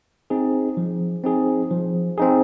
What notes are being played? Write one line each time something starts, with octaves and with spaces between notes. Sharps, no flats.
C4 D#4 G#4
F3
C4 D#4 G#4
F3
C4 D#4 G#4